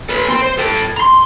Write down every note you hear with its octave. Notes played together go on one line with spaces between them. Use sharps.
A4 B4
C4 C6
C5
A4 G5
A#5 C6